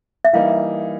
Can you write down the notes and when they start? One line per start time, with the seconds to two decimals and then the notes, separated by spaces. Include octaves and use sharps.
0.25 E5
0.33 E3 G3 A#3 D#4 F5